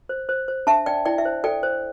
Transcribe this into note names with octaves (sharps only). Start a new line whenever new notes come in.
C5
C5
C5
D4 E5 A5
D4 D5 G5
E4 D5 G5
E5
C5
A4 D5 G5
C5